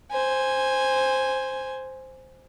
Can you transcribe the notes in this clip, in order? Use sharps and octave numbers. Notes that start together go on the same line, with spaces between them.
C5 G#5